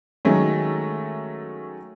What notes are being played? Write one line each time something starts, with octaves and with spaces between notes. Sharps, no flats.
D#3 F#3 G#3 A3 C#4